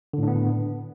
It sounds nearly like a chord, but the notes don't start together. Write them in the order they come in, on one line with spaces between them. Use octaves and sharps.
D3 A2 D4 B3